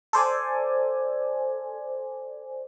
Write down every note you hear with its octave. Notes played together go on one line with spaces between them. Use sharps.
A4 C5 D5 G#5